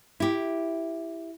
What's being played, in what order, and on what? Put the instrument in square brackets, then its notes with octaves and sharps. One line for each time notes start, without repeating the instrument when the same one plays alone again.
[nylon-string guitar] E4 G4